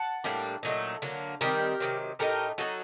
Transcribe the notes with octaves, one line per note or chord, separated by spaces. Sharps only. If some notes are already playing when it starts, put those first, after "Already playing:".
Already playing: F#5 A5
A2 G3 A#3 D4
A#2 F#3 A3 D#4
D3 F#3 A#3
D#3 G3 C4 G4 A#4
C3 D#3 F#3
A2 A3 D#4 G4 A#4
F#3 A#3 D#4 F#4 A4